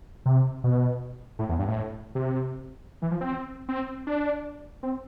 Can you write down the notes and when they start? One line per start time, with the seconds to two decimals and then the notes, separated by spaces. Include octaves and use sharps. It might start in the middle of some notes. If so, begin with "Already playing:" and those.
0.26 C3
0.64 B2
1.39 A2
1.49 E2
1.59 G2
1.68 A2
2.15 C3
3.02 E3
3.11 F3
3.21 C4
3.68 C4
4.07 D4
4.83 C4